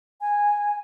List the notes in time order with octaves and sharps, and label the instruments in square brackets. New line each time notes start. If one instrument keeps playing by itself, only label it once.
[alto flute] G#5